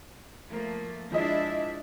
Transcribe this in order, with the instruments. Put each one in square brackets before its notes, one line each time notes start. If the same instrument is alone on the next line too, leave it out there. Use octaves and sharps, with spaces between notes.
[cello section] F3 A3 A#3
[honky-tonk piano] F3 G#3 D#5 [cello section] D4 E4 E5